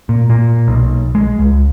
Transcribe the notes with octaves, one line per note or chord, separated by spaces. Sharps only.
A#2
A#2
B1
G#3
C#2